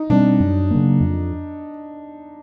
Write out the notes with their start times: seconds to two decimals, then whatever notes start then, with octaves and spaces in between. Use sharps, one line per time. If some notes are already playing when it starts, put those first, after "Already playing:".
Already playing: D#4
0.10 B2 G3 C4 D4
0.40 F#2
0.71 C#3 F#3 A#3
1.01 F2